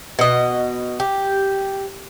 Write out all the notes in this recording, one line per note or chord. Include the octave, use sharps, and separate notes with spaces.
B2 D#5
G4